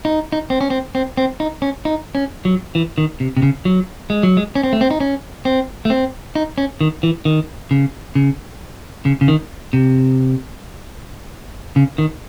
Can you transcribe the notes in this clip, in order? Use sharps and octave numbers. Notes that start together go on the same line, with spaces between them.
D#4
D#4
C4
C#4
C4
C4
C4
D#4
C#4
D#4
C#4
F#3
E3
D#3
C3
C3
C#3
F#3
G#3
F#3
G#3
C#4
C4
A3
C4
D#4
C#4
C4
A3
C4
D#4
C#4
D#3
E3
D#3
C#3
C#3
C#3
C#3
D#3
C3
C#3
D#3